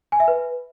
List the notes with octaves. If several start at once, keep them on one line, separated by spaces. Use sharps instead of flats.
G#5
E5
B4